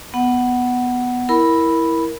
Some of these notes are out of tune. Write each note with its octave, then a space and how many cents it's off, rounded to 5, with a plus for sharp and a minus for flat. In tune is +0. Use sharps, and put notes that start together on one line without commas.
B3 +0 F#5 +10
E4 +0 A#4 +0 B5 -5